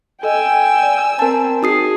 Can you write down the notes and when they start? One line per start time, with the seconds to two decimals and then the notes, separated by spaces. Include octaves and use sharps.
0.23 A4 D#5 G5 G#5 E6
0.83 D5
1.19 C4 A#4 A5
1.63 D#4 F#4 G#4 D#6 C7